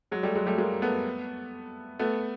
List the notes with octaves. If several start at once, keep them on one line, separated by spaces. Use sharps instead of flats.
F#3 G#3
G3 A3
F#3 G#3
G3 A3
G#3 A#3
A3 B3
A3 B3